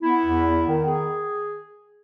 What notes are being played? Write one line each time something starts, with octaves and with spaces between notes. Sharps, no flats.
B3 E4
E2
B3
D#3
G#4